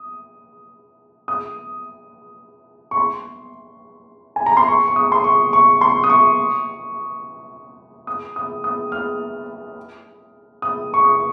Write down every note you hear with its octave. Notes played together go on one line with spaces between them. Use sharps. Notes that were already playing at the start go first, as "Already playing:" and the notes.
Already playing: D#6
D#6
C#6
C6
G#5
A#5
C6
C#6
C#6
D#6
C6
C#6
C#6
C6
D#6
C#6
D#6
D#6
D#6
F6
D#6
C#6
D#6